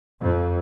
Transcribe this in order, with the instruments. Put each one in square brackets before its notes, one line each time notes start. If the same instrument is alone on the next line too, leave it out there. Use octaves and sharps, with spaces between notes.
[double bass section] F2